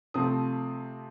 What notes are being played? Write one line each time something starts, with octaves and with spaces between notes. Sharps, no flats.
C3 F3 A3 C4 D#6